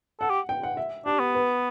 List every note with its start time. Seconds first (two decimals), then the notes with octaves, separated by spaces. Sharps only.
0.20 A4 F#5
0.30 G4
0.49 G5
0.63 F#5
0.77 E5
1.06 D4 G4
1.19 B3
1.35 B4